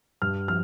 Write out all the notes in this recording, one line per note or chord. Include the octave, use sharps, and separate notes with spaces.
G2 F6
F3 F6